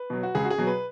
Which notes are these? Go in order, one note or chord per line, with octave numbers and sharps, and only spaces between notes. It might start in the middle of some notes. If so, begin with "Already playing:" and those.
Already playing: B4
B2 F#3
F#4
C#2 G#4
F#4
G#4
B2 F#3
B4